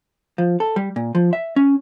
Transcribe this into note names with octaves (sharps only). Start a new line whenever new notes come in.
F3
A4
G3
A#2
F3
E5
C#4